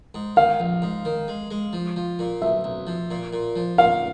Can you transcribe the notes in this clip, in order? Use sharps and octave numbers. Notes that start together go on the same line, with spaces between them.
G#2
D#3 F5
A#1
G#2
D#3
G#3
G#3
F3
F3
A#2
B1 E5
B1
F3
A#2
A#2
F3
A#2 F5